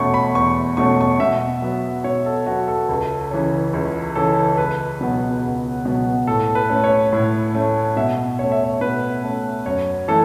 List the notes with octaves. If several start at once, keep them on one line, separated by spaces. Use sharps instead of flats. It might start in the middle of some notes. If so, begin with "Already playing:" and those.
Already playing: E2 B2 A3 C#4 B5 C#6
B5
E2 C#6
B2 A3 C#4 C#6
C#6
B2 E5
F#3 B3
B2 C#5
A4
F#3 B3 F#4
A4
C#2
C#3 E3 C#4
C#2
C#3 E3 C#4 A4
C#2 B4
B2 F#3 B3
C#2
B2 F#3 B3
A2 A4
B4
A3 C#4
C#5
A2
A3 C#4
B2 E5
A3 C#4 C#5
E5
C#5
B2 B4
A3 C#4
F#2 C#5
E3 A3 A4